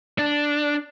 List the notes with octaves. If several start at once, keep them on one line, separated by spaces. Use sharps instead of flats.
D4